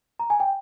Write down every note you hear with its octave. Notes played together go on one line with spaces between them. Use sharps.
A#5
G#5
G5